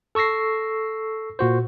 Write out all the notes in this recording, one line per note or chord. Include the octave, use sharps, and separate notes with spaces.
A4 C#6 E6 A#6 C7
A#2 F#4 C5